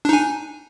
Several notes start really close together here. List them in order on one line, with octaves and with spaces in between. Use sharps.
D4 D#4 G#5